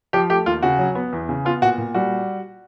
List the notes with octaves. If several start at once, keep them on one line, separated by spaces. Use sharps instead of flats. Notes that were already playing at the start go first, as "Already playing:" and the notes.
F3 G4
A3 G4
D#2 F4
C#3 F#4
F#3
B3
E2
C#3
B3 F4
A#2 F#4
A#2
G3 F#4